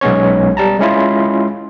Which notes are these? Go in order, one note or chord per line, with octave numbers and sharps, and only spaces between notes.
B1 G#3 B3 C#4 C#5
G3 A5 A#5
G#3 C#4 E4 F4